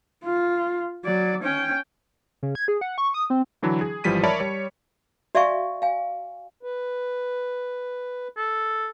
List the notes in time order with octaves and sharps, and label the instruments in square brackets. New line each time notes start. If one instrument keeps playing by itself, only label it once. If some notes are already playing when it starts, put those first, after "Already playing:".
[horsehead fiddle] F4
F#3 D5
C#4 G5
[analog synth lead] C#3
G#6
G#4
F#5
C#6
D#6
C4
[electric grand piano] D3 E3 F#3 D4 E4
G#4
G#1 E3 F3 G3 B6 D#7
A#4 C#5 D5 E5 A5 B5
G3 C#5
[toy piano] F#4 D5 E5 F5 G#5 C#6
F5 G#5
[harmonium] B4
[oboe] A4